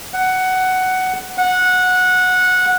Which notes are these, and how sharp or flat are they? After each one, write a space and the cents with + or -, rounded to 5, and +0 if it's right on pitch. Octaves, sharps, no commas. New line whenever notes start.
F#5 +10
F#5 -15